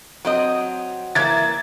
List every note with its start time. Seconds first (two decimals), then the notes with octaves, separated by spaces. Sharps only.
0.25 F#3 C4 D#5
1.15 E3 A#3 G#6 A6